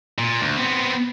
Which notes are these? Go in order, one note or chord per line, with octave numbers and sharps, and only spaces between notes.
A#2
D2
B3 C4